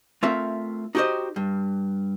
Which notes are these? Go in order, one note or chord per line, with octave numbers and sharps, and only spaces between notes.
A3 C4 F4 A#4 E5
D#4 F#4 G4 B4 C5 D#5
G2